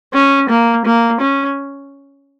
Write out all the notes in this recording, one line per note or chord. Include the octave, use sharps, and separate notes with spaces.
C#4
A#3
A#3
C#4